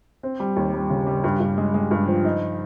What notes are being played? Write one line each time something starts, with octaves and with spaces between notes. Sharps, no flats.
C4
G3
D#2
G3
C#3
G3
G2
G2
G#3
G#3
G2
F3
D#4